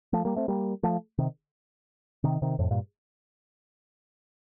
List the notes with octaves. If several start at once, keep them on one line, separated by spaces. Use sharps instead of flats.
F3 A3
G3 A#3
A3 C4
G3 A#3
F3 A3
C3 D#3
C3 D#3
C3 D#3
F2 A2
G2 A#2